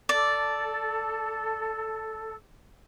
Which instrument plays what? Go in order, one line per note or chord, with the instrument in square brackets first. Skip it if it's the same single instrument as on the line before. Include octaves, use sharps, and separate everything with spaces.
[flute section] A4 [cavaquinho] D5